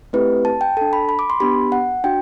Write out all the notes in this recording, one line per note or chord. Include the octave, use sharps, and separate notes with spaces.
A3 C4 E4 G4 B4
A5
G5
D4 A4 A5
B5
B5
D6
C6
B3 D4 G4 B5
F#5
D4 F#4 G5